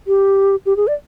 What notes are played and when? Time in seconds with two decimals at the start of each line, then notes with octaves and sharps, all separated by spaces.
0.07 G4
0.66 G4
0.76 G#4
0.87 D5